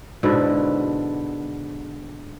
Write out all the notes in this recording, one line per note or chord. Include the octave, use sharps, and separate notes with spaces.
G#2 B2 D3 E4